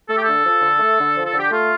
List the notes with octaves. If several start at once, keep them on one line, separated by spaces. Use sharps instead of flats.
A3 A4
G4
D3 A4
F3
D3
A3
D3
F3
A4
D3
G4
A3 F4